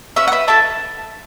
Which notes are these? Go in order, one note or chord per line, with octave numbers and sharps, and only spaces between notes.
C#4 B4 E5
F#5
B4 E5
E4 A4 E5 A5